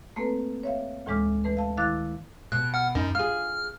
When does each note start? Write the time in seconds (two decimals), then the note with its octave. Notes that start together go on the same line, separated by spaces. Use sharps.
0.16 A3 A#3 C4 A4 B4
0.63 C#5 E5 F5
1.06 D2 A2 E3 G#3 D6 F6
1.44 E3 A3 B4
1.57 F5 A5
1.77 D#3 E4 F5 D6 F#6 A6
2.52 B2 F#6
2.74 F#5 F6
2.95 F#2 D#4
3.15 F4 G#4 F6